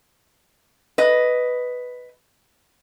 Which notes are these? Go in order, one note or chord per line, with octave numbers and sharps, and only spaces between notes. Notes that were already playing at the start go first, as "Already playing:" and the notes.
B4 D#5